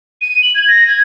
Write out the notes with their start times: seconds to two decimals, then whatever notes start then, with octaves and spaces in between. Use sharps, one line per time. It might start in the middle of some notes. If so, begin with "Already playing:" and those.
0.21 D#7
0.43 F#7
0.55 G#6
0.68 A#6
0.87 G#6